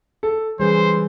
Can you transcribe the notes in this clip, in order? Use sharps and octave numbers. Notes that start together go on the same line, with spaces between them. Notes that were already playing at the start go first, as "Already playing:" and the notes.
A4
C#3 E3 G3 G#4 C5